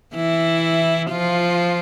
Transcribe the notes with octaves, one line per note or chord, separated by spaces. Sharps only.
E3 E4
F3 F4